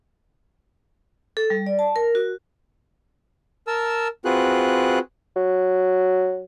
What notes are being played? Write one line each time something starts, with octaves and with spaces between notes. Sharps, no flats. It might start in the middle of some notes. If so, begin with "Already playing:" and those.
A4
G3
D5
A5
A#4
F#4
A#4 A5 E6
C4 F4 F#4 G#4 B4 F#6
F#3